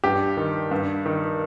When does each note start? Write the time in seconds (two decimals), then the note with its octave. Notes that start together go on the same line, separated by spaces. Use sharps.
0.04 G2 G4
0.37 D#3
0.71 G2
1.06 D#3